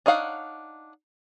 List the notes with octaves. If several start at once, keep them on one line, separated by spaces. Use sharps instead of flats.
D4 D#4 C#5 F5 F#5